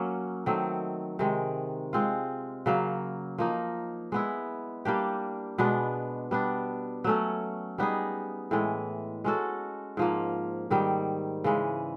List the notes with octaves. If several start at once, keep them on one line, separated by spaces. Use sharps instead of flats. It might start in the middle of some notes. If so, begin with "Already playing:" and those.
Already playing: F#3 A#3 C#4
D#3 F#3 A3 C4
C3 D#3 G#3
G#3 C4 F4
C#3 F#3 A#3
F3 A#3 D#4
G#3 B3 E4
G3 A#3 D4 G4
B2 G#3 B3 D4
G3 B3 D4
F#3 A3 C#4
G3 B3 D#4 G#4
A2 E3 G#3
G#3 C#4 F#4 A4
G#2 F3 A#3
G#2 D#3 G3
C#3 E3 G#3